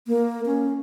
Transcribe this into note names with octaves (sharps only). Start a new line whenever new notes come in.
A#3
C#4